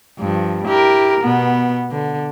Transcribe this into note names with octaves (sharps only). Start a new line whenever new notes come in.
G2 F3
E4 G4 A#4
B2 B3
D3